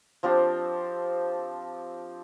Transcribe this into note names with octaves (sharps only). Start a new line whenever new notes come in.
F3 C4 D4 G4